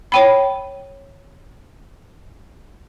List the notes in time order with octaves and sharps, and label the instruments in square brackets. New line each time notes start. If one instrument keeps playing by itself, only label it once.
[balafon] C#5 G5 B5